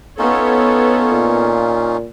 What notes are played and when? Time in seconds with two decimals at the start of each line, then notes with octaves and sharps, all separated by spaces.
0.19 B3 C#4 D#4 F4 A4 C#5
1.11 A#2